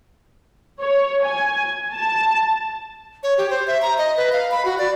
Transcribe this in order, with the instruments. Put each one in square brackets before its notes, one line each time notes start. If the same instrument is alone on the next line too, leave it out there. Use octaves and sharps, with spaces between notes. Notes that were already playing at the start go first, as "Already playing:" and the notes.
[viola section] C#5
G#5
A5
[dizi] C#5
G4
C5
E5
A#5
D#5
B4
F5
B5
F#4
D5